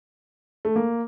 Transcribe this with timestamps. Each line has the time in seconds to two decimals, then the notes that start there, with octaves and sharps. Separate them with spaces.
0.65 A3
0.76 A#3